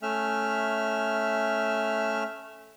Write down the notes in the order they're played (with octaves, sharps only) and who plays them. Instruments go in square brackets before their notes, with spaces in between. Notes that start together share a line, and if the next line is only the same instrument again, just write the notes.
[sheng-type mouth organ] A3 C#4 E5 F6